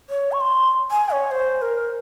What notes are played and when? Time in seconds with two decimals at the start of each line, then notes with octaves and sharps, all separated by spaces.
0.10 C#5
0.32 C#6
0.41 C6
0.91 G#5
1.11 C#5
1.31 C5
1.62 A#4